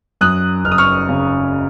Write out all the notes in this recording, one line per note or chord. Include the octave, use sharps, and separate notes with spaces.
F#2 D#6 F#6
F#1 F6
D#6
C#6 F6
C#3